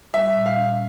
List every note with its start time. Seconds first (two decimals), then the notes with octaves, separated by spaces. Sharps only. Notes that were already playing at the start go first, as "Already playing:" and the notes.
0.14 G3 E5
0.35 A#2
0.46 F5
0.57 C#4